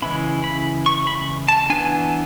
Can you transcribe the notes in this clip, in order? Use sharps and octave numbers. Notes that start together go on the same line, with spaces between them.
C#3 E3 G#3 C#4 E4 B5
B5
C#6
B5
A5
E3 B3 D4 G#5